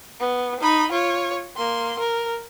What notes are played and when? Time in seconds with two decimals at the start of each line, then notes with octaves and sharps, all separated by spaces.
0.20 B3
0.60 D#4 B5
0.92 F4 C#5
1.56 A#3 C6
1.99 A#4